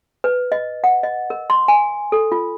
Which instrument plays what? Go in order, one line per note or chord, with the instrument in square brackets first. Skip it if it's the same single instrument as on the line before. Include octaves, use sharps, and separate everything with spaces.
[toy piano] B4
D#5
F#5
D#5
A#4
C6
G#5
A4
F4